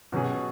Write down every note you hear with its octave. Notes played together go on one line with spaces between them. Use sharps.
B2 F#3 C#4 G#4